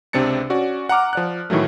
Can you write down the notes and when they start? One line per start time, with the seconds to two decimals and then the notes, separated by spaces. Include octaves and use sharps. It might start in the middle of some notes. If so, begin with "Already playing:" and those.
0.13 C#2 C3 C4 D4 A6 C#7
0.50 C#4 F#4 D5
0.89 F#5 A#5 D6 F6
1.13 F3 D5 F#6
1.50 A2 D#3 E3 F#3 A3